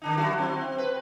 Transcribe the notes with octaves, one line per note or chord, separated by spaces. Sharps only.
D3 D4 D#4
F#3 E4 F#4
C4
B4